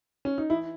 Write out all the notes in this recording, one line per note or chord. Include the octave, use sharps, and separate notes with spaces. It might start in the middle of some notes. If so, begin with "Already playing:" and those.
C#4
D#4
E3 E4